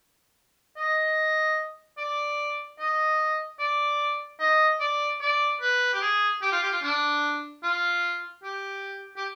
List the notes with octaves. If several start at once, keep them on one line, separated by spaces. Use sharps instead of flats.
D#5
D5
D#5
D5
D#5
D5
D5
B4
G4
G#4
G4
F4
G4
F4
D4
F4
G4
G4